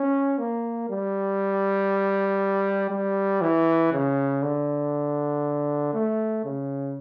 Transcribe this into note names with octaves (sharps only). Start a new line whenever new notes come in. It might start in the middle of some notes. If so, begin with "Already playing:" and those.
Already playing: C#4
A#3
G3
G3
E3
C#3
D3
A3
C#3